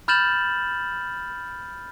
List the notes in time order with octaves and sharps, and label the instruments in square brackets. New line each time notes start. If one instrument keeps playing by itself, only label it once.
[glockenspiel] B5 F6 G6 A6 E7 F#7